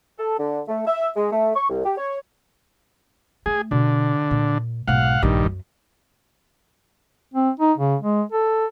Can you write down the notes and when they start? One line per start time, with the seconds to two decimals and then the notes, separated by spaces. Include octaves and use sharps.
0.18 A4
0.38 D3
0.68 A3
0.87 E5
1.16 G#3
1.32 A3
1.55 C#6
1.70 C2
1.84 G4
1.98 C#5
3.46 A3 G#4
3.71 B2 D3
4.31 A#2
4.88 B1 G#2 F5 F#5
5.22 A#1 G2 D#3
5.43 F#2 F#3
7.34 C4
7.60 D#4
7.78 C#3
8.01 G#3
8.32 A4